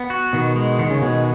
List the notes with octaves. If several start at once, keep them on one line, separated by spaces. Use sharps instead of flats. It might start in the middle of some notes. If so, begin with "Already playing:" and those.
Already playing: B3
F#4
B2 D#3
G#3
D#3
C#3
B2 G#3